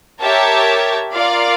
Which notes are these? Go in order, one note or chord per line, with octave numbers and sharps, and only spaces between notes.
G4 A#4 C#5 E5 A5
F4 A#4 D5 F5